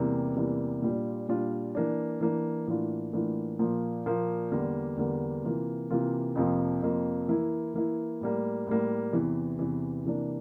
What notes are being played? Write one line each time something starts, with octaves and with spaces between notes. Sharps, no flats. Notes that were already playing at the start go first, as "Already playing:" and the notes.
Already playing: E2 C3 E3 G3 A#3
E2 C3 E3 G3 A#3
A#2 G3 D4 F4
A#2 G3 D4 F4
E3 A#3 D4
E3 A#3 D4
A2 E3 A#3 D4 F4
A2 E3 A#3 D4 F4
A#2 F3 A#3
A#2 F3 A#3
E2 D3 G3 A#3
E2 D3 G3 A#3
C3 E3 A#3 F4
C3 E3 A#3 F4
F2 C3 F3 A#3
F2 C3 F3 A#3
E3 A#3 E4
E3 A#3 E4
A2 G3 A#3
A2 G3 A#3
E2 C3 E3
E2 C3 E3
C3 E3 A#3 D4